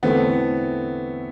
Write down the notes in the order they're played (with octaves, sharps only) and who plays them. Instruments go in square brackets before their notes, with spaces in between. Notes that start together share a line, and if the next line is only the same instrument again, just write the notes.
[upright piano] E2 D3 A3 C4 E4 [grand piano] B3